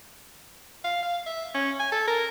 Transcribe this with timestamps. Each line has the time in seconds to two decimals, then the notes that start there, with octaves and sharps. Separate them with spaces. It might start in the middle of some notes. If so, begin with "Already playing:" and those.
0.84 F5
1.03 F5
1.26 E5
1.54 C#4
1.79 G#5
1.92 A4
2.07 A#4